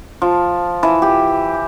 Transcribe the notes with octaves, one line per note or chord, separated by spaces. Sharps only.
F3
E3
G4